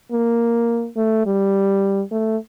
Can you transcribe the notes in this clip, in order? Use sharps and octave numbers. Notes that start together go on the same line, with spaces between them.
A#3
A3
G3
A3